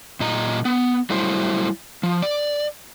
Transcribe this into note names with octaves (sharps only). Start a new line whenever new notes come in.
A#2 D#5 A#5
B3
F#3 G3 A3 E4 C5
F3
D5